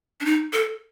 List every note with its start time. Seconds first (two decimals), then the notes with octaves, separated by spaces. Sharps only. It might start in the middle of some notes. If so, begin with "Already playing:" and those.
0.21 D4
0.25 D#4
0.53 A4